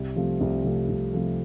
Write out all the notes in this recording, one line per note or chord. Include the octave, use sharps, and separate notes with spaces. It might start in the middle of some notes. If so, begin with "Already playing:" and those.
Already playing: C2
C3 F3 A3
C2
C3 F3 A3
C2
C3 F3 A3